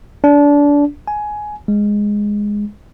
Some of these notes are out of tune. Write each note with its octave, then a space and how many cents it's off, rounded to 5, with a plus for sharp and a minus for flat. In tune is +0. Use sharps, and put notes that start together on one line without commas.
D4 -25
G#5 +15
G#3 -5